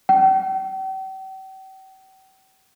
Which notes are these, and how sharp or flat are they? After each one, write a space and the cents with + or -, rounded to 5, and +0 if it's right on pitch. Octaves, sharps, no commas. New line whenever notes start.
G5 -40